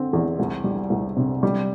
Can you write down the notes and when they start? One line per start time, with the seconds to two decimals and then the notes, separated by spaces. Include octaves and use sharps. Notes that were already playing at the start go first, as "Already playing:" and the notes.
Already playing: D3 C4
0.13 E2
0.39 C2
0.64 G3
0.90 C2
1.17 C3
1.43 G3